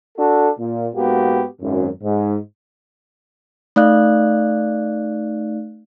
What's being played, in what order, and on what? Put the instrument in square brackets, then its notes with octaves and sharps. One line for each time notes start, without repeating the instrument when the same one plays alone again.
[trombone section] D4 F#4 A4
A#2
G#2 A#3 B3 F#4 G4
G#1 F#2
G#2
[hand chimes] A3 D#4 D5 F5 F#6